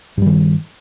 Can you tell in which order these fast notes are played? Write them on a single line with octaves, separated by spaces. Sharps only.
G2 G3 D#3